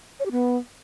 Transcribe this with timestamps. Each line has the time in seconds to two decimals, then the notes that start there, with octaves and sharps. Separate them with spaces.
0.20 C#5
0.26 G4
0.31 B3